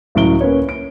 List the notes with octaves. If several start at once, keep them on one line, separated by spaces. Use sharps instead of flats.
C#2 A2 F#3 D7 G7
A#3 C#4 B4 C#5
D7